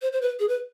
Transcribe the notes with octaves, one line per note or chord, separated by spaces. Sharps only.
C5
C5
B4
G#4
B4